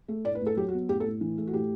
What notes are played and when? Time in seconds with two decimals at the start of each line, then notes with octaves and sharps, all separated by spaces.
0.08 A3
0.25 A2 D5
0.35 B4
0.41 A2
0.46 A4
0.57 F#3 G4
0.68 F#4
0.73 B3
0.89 A2 G4
1.00 A4
1.05 A2
1.21 E3
1.38 A3
1.47 F#4
1.53 A2 G4